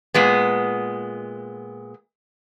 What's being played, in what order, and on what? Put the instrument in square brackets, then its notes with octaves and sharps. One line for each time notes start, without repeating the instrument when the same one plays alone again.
[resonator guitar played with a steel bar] A#2 G#3 B3